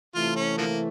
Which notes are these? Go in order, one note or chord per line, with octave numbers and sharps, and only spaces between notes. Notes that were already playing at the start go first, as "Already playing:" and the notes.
C3 E3 A3 F4
C#4
D3 F3 A#3